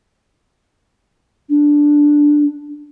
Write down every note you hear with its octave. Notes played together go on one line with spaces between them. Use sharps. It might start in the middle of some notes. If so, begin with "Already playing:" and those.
D4